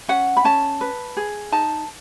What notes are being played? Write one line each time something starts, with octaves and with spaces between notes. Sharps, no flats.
C#4 F#5
B5
C#4 A5
B4
G#4
D#4 A5